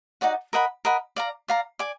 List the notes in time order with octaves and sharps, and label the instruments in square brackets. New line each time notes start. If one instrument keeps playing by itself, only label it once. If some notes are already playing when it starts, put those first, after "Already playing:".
[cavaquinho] D#4 F#4 D5 F#5
A#4 D#5 F#5 B5
A#4 D#5 F#5 B5
D5 F5 A#5
D5 F5 A#5
D5 G#5 D6